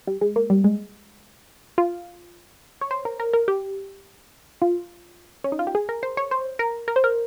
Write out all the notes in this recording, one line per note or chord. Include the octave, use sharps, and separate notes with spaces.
G3
G#3
A#3
G3
G#3
F4
C#5
C5
A#4
A#4
A#4
G4
F4
C#4
D#4
F4
G4
G#4
A#4
C5
C#5
C5
A#4
A#4
C5
A#4